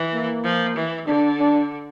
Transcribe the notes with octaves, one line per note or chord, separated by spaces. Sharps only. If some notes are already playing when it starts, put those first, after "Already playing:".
Already playing: E3
A#3
F3
E3
D3 D4
D4